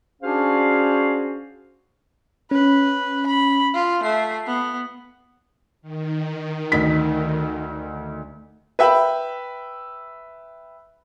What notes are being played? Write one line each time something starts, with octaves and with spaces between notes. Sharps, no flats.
C#4 D4 F#4 G#4 C5 F5
C#4 B4
B5
F4
A3 C7
B3
D#3
D2 D#4 B6
B4 E5 G5 B5